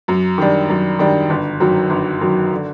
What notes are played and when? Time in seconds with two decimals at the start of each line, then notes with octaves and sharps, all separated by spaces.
0.08 F#2
0.38 D#3 G3 D4
0.69 F#2
0.99 D#3 G3 D4
1.30 G1
1.60 F#2 D#3 F#3
1.90 G1
2.21 F#2 D#3 F#3
2.52 D3